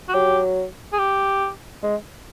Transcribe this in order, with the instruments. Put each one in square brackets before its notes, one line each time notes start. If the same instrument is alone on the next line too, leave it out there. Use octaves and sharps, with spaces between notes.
[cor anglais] F#4
[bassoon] F#3 [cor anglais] G4
[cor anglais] G#4
G4
[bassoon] G#3